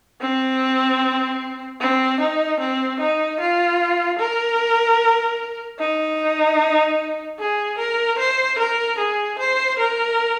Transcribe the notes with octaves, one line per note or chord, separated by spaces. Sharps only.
C4
C4
D#4
C4
D#4
F4
A#4
D#4
G#4
A#4
C5
A#4
G#4
C5
A#4